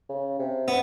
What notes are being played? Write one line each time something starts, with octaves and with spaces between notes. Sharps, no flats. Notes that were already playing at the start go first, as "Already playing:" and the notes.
C#3
C3
B3